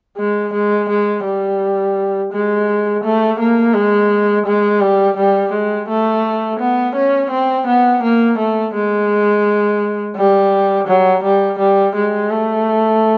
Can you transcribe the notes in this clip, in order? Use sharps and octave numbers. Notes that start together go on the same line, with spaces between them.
G#3
G#3
G#3
G3
G#3
A3
A#3
G#3
G#3
G3
G3
G#3
A3
B3
C#4
C4
B3
A#3
A3
G#3
G3
F#3
G3
G3
G#3
A3